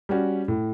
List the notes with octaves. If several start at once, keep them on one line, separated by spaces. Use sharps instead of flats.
G3 C#4 F#4
A2